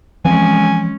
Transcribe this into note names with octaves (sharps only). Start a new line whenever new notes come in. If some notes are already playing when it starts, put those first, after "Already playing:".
E3 F3 G#3 C4 C#4 G#5